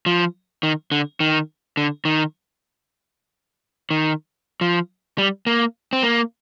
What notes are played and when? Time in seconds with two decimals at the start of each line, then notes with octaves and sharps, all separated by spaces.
0.06 F3
0.63 D#3
0.92 D3
1.20 D#3
1.77 D3
2.05 D#3
3.91 D#3
4.61 F3
5.18 G3
5.47 A#3
5.93 C4
6.03 A#3